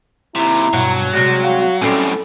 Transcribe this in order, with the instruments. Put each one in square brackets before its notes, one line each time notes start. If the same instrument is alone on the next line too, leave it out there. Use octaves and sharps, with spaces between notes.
[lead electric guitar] D#2 C3 [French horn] E4 [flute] A#5
[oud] G2 B2 [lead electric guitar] F#3
[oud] C3 G3 G#3 [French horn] F#4 [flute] A#6
[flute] F5
[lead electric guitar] F#2 A2 [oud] G3 C4 C#4 [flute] A4